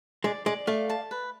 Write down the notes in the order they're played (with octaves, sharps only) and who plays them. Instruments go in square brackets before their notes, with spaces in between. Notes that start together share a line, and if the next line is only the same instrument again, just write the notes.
[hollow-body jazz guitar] G#3 [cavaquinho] D5
[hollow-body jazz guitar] G#3 [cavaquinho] D5
[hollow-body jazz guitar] A3 [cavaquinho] F5
[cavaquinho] A5
B4